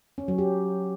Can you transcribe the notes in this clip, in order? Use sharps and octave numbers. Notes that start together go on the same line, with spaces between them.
C#4
F#3
G4